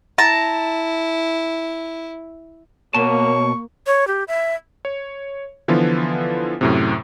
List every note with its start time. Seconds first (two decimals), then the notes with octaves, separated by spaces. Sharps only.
0.18 E4 A5 A#5
2.95 B2 A#3 C#5 A5 C#6
3.87 C#5
4.07 G4
4.28 E5
4.85 C#5
5.68 D3 E3 F3 B3 F4
6.61 F#2 A2 C3